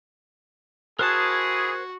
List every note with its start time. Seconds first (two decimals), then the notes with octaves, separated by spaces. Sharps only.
0.99 E4 F#4 G#4 A#4 C5 A5 F#6 G#6